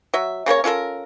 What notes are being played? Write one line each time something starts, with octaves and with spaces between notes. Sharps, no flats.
F#3 E5
C#3 A#3 A#4 C#5
C#4 F4 A4 A#4